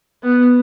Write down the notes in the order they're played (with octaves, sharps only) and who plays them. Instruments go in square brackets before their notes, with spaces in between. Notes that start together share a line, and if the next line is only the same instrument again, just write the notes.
[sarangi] B3